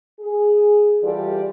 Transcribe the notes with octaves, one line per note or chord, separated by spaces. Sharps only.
G#4
E3 G3 F4 G4 A4 D5